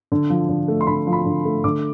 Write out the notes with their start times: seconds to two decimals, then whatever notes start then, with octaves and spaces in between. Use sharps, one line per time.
0.12 D3
0.30 F3
0.49 D3
0.68 A3
0.81 C6
0.87 D3 B5
1.07 F3
1.13 B5
1.26 D3
1.45 A3
1.64 D3 D6